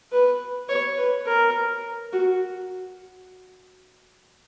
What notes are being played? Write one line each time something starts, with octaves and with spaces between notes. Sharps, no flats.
B4
C#5
B4
A#4
F#4